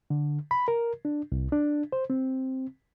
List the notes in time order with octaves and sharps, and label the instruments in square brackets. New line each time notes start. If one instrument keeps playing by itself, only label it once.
[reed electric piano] D3
B5
A#4
D4
C2
D4
C5
C4